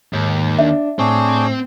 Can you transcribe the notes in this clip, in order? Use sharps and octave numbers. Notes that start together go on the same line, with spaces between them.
D#2 G#2
D4 E5
A2 C4 D4 G#4 C#5